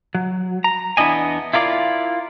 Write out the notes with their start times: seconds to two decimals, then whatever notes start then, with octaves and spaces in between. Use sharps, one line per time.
0.15 F#3
0.64 A#5
0.97 E2 B3 D4 E4 D#5 G#5
1.53 E4 F4 A#4 D5 F5